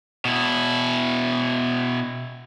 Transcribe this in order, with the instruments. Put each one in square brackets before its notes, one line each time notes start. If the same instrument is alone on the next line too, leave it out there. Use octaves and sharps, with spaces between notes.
[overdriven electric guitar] B2 E4